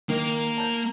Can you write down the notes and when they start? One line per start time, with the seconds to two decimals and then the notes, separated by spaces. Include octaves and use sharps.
0.09 D#3 A#3
0.57 A5 G6